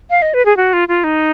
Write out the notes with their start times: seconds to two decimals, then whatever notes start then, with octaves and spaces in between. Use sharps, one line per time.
0.10 F5
0.22 D#5
0.34 B4
0.46 G#4
0.57 F#4
0.73 F4
0.88 F4
1.04 D#4